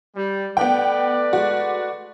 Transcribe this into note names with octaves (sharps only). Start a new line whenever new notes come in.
G3
A3 B3 B4 D5 G5
G#3 F#4